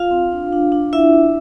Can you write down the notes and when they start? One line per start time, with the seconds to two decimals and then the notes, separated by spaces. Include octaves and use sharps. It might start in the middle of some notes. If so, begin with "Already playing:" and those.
Already playing: F4 F5
0.11 C4
0.32 D4
0.52 D4
0.72 D4
0.93 E4 F4 E5
1.13 D4